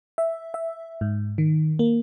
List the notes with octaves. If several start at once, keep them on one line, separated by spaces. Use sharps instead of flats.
E5
E5
G#2
D#3
A#3